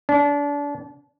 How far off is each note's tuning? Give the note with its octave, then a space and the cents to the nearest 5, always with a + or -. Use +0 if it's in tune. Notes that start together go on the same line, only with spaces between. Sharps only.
D4 -30